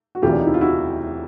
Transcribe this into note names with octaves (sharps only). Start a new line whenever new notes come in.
F#4
E1 D2 C3 E3 F4 G4
D4
D#4
E4
F4
E4 F#4